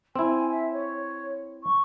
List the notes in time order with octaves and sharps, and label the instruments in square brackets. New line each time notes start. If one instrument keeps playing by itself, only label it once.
[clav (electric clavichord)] C4 E4 [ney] G#5
[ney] E5
C#5
C#6